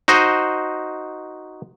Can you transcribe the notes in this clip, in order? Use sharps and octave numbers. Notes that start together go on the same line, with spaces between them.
D#4 F#4 C5 D#5